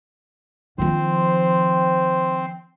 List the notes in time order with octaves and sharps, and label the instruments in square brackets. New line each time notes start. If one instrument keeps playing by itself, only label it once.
[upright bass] D#3 F3 [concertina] C4 C5